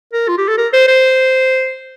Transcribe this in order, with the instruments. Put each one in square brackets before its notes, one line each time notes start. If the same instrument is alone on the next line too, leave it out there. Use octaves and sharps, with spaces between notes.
[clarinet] A#4
F4
G4
A4
A#4
C5
C5